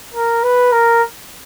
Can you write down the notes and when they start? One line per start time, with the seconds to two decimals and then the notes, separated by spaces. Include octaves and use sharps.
0.14 A#4
0.43 B4
0.72 A#4